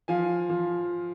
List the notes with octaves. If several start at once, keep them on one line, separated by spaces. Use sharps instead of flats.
F3 F5 G#5
F3